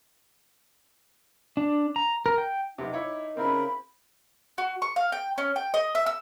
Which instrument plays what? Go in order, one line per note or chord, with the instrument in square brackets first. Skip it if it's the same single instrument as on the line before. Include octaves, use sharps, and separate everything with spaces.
[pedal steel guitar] D4
A#5
A#4
G5
[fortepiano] B1 C3 [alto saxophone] D#4
[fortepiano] E4 C#5 D6
[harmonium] C#3 A#4 [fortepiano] C4 E4 [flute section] B5
[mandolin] F#4
C#6
F5
G5
C#4
G5
D#5
E5
E6